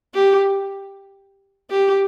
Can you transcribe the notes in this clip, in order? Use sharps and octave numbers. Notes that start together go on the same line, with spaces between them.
G4
G4